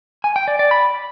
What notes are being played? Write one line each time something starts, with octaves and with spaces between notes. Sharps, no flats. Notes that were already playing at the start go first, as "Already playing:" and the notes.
G#5
G5
D5
D5
B5